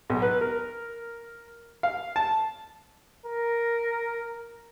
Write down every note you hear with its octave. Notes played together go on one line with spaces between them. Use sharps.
B1
B4
A#4
F5
A5
A#4